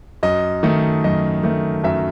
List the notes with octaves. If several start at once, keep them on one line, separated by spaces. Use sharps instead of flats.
F#2 D#5
D#3 A3
F#2 D#5
D#3 A3
F#2 E5